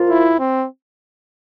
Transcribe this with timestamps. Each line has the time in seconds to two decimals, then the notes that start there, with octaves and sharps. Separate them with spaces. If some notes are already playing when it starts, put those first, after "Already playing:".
Already playing: C2 A#2 F3 A#3 F4
0.09 E4
0.39 C4